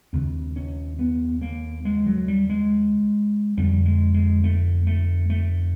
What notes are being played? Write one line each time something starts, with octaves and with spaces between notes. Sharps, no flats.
D#2 C#3 C4
C#4
B3
A#3
G#3
F#3
G3
G#3
F2 D3 G3
G#3
G#3
A3
A3
A3